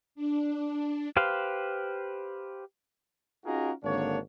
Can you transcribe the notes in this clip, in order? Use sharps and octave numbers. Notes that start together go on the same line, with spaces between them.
D4
G4 B4 C5 F5
C#4 D#4 F4 F#4 G#4 A#4
G#1 D3 A#3 D4 C#5